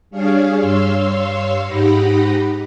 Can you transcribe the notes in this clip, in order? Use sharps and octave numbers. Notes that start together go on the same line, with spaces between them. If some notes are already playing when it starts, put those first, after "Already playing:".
G3 D4 G#4 C#5 F5
G2 C#5 F5 C6 E6
G#2 D#4 G4 F#5 B5 A#6